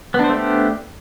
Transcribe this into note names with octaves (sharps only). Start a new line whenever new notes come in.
A3 B3 D4 G4 C5